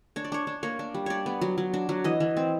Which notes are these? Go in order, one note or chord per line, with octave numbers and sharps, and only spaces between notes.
D4 C#5
D5
D4 C#5
D4
A#3 C#5
D4
G3
D4 C#5 D5
B3
F#3
F#3
D4
F#3
E3 D#5
E3
C4